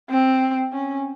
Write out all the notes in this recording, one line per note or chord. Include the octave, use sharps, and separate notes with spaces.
C4
C#4